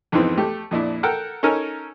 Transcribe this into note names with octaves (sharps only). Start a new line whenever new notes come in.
F2 G#2 E3 B3 C4
A3 G4
F2 A#2 D4 E4
A4 A#4 F#5 G5
C#4 D#4 A4 A#4 G#5